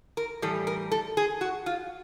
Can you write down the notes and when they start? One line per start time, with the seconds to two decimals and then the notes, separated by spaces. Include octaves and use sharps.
0.17 A#4
0.42 A2 E3 G3 A4
0.67 A#4
0.91 A4
1.17 G#4
1.41 F#4
1.66 F4